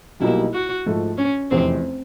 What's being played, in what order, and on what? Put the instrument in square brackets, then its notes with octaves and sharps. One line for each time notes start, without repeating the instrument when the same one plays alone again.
[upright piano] B1 B2 G3 A#3 D#4 [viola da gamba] E4
[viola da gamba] F#4
[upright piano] G#2 F3 A3
[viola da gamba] C#4
[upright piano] F1 E2 C3 [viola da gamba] C4